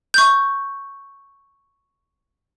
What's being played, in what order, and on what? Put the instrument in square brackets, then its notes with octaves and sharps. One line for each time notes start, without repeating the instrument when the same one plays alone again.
[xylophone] C#6 G6